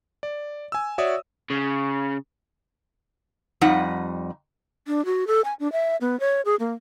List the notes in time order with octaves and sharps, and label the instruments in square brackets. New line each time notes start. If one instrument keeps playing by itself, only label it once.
[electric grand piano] D5
G#5 E6
F#4 C#5 D5 E5 D#6
[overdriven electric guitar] C#3
[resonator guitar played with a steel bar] F2 G3 D#4 F#5
[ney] D4
F#4
A4
G#5
D4
E5
B3
C#5
G#4
A#3